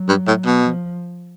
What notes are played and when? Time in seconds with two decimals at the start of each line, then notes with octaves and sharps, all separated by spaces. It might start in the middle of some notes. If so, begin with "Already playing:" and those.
Already playing: F#3
0.09 G2
0.27 A2
0.46 B2
0.65 F3